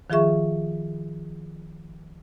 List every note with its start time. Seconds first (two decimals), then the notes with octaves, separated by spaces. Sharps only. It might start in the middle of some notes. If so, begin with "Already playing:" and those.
0.10 D#3 F3 F4 G#4 E5 C#6